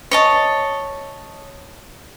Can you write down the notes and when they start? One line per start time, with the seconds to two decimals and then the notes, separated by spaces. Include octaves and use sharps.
0.11 C#5 D#5 A5